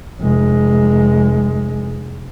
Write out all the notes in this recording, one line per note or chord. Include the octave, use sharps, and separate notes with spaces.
F1 G#3